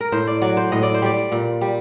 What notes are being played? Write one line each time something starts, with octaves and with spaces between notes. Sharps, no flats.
A#4
A2 C5
D5
F#3 D5
C5
A2 D#5
D5
C5
G3 D5
A#2
G3